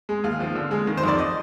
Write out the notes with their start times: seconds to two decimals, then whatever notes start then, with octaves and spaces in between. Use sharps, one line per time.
0.09 G#3
0.24 D#2 F5
0.40 F3
0.55 D3
0.71 G#3
0.87 D#3
0.97 C5
1.04 F2 D5
1.19 D#5